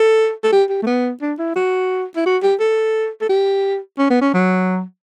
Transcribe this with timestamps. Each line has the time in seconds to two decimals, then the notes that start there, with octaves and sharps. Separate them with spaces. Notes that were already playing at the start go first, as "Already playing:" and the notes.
Already playing: A4
0.44 A4
0.52 G4
0.69 G4
0.82 A3
0.86 B3
1.21 D4
1.39 E4
1.56 F#4
2.16 E4
2.26 F#4
2.42 G4
2.60 A4
3.21 A4
3.29 G4
3.99 C#4
4.10 B3
4.21 C#4
4.33 F#3